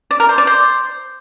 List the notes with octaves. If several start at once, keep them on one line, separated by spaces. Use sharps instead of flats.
D5
A#4
C5
D5
C5